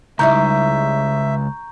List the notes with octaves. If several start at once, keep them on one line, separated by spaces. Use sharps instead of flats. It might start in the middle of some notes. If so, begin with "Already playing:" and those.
C#2 G3 D#4 E4 E5 A#5 C#6 G6